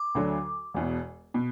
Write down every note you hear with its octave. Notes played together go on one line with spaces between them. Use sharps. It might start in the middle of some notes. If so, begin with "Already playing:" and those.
Already playing: D6
D2 D3 F#3 D4
E1 E2 B2
B2